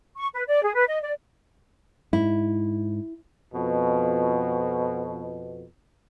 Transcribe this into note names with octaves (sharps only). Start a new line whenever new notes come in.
C#6
B4
D5
G#4
B4
D#5
D5
G#2 E4
F2 B2